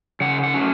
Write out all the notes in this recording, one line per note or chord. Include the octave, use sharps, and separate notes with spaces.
C#3 F#5
F#5
F#3 A3 C#4